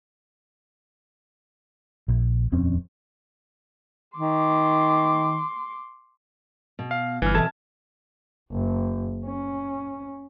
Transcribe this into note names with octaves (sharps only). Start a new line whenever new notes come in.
A#1
D#1 F2 C4 C#4
D#3 C6 D6
B2
F5
G1 E3 G#5 F6
B2 E3 A4 A5 G#6
F#1
C#4